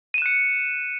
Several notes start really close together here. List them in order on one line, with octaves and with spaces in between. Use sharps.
D#7 E7 F#6 C#7